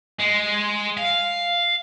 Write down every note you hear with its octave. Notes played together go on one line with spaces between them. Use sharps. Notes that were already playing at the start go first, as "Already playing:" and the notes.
G#3
F5